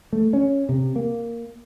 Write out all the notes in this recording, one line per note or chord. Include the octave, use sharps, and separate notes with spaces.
A3
C#4
C3
A#3